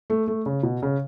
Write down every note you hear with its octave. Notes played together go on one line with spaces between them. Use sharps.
A3
A3
C#3
B2
C#3